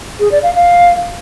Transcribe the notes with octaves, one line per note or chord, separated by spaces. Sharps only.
G#4
D5
F5
F5